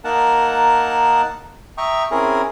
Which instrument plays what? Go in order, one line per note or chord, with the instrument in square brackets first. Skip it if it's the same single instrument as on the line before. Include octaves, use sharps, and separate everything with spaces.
[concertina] A#3 D#4 A#4 F#5 A5
E5 G5 A#5 C#6 D#6
C4 C#4 E4 G#4 A#4